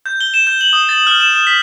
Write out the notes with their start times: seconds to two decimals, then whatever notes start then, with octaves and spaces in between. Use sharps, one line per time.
0.06 G6
0.21 G7
0.34 E7
0.47 G6
0.61 F#7
0.73 D#6
0.89 A6
1.07 F6
1.20 E7
1.34 E7
1.47 B6